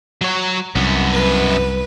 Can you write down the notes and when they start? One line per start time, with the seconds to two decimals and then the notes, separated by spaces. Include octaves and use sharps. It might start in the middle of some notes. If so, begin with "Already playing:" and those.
0.21 F#3 C#5
0.75 C2 F#2 B3
1.14 B4